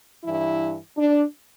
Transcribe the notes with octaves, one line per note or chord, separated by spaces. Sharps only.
G2 E3 E4
D4